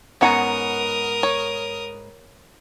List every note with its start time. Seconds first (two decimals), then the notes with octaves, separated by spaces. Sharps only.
0.21 G#2 B3 C#4 A#4 C#5 F#5 A#5 D#6
1.23 C#5